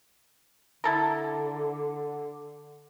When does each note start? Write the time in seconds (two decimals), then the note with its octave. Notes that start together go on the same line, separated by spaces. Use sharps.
0.84 D3 E4 A4 A#4